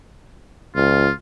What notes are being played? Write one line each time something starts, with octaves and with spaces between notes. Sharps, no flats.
C#2 F4